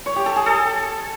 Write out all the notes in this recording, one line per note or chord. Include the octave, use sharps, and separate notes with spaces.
C#5
G4
A4
G#4
A4